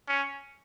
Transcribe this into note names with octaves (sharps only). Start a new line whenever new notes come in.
C#4